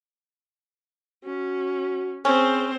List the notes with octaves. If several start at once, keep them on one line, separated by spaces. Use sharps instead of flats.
C#4 F#4
C4 C#4 G#4 C5